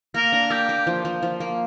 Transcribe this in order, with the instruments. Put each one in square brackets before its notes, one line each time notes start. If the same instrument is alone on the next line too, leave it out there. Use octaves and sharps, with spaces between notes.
[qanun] A#3 [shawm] A#4
[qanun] D4 [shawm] A#4
[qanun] A#3 [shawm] G4
[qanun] A#3
F3
F3
F3
A#3